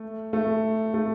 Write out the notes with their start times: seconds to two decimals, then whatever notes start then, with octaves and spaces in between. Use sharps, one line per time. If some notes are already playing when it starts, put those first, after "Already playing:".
Already playing: A3
0.33 A3
0.94 A3